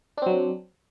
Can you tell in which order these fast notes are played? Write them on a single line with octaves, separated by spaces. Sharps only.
D4 C4 F#3